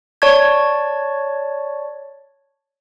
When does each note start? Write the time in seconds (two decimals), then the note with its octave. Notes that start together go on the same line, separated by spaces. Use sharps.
0.22 C#5 D5 A5 C#6 G#6